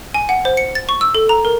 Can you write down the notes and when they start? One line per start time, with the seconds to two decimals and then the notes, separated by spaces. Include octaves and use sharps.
0.14 G#5
0.29 F#5
0.45 C5
0.57 C#7
0.75 A6
0.89 C#6
1.01 E6
1.15 A4
1.29 A#5
1.45 A#4